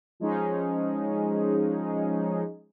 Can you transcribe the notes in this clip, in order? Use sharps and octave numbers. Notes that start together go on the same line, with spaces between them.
F3 G#3 C#4 D#4 G#4